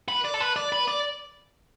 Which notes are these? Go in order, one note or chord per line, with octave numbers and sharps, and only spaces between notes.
B4
D5
A4
B4
D5
B4
D5